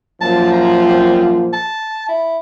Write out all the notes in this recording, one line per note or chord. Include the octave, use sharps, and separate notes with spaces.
F#2 A#2 F3 A5
A#5
C4
A5
E4